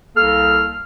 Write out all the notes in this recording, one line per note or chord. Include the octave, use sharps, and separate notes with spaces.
C2 A#3 A4 F5 F6